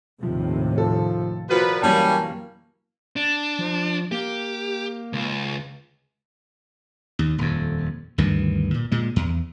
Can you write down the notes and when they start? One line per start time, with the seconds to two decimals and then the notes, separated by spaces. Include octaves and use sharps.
0.23 D#2 A2 C3 F3
0.78 F3 A4
1.49 A#2 F3 F#4 B4
1.82 F#2 E3 G3 A#3 C#4 A5
3.16 D4
3.59 F3
4.12 A#3 G4
5.13 C#2
7.19 D#2
7.38 D#1 F2
8.18 D2 G2 D#3 E3
8.74 A#2
8.92 A#2 G#3
9.16 E2